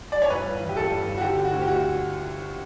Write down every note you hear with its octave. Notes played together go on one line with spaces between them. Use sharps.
D5
C#5
G2 B4
G1
E3
G4
G1 A4
G2
G1
F#4
D3 G4
D3
F#4
D2
G4
D2 F#4